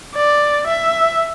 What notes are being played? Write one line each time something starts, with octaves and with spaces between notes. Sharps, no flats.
D5
E5